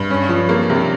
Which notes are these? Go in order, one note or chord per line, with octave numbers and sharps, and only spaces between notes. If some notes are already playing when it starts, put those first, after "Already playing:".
Already playing: G2
C#4
F3
A#3
C3